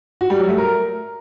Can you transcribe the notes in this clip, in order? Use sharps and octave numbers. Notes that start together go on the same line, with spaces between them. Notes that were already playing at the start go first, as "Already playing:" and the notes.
F#4
G3
F#3
A3
A#4